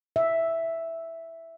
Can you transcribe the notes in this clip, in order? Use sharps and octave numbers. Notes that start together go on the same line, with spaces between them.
E5